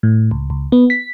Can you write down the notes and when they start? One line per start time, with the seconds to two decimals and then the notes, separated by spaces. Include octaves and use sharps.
0.03 A2
0.31 C#2
0.50 C#2
0.72 B3
0.90 B6